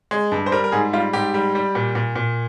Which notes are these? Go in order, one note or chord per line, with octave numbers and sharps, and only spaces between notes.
G#3
G2
C5
G3 A#4
A#4
G#2 G#4
G3 F4
G#2 G4
G3
G3
A#2
A#2
A#2